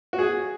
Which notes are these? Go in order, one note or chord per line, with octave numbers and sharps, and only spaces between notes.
F#4
G#4